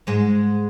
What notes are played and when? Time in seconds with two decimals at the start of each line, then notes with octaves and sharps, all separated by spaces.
0.07 G#2 G#3